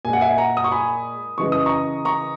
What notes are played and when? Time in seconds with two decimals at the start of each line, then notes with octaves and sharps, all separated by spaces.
0.05 A#2 G#3 G#5
0.13 F#5
0.21 E5 G#5
0.38 F#5 A#5
0.57 D#6
0.64 C#6
0.71 G#5 B5
1.38 C#3 E3 G#3 C#6
1.52 D#6
1.66 A#5 C#6
2.05 A#5 C#6